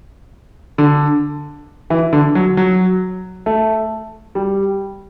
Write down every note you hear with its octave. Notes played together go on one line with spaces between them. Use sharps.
D3
E3
D3
F#3
F#3
A3
G3